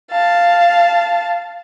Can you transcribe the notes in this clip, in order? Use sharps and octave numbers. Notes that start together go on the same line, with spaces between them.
F5 A5